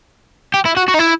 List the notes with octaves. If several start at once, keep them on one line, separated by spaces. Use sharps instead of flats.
G4
E4
F#4
F#4
D#4
E4